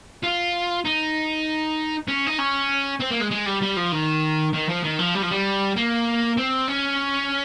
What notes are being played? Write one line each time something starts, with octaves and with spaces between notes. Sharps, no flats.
F4
D#4
C#4
D#4
C#4
C4
A#3
G#3
G#3
G3
G3
F3
D#3
D#3
F3
D#3
F3
G3
F3
G3
A#3
C4
C#4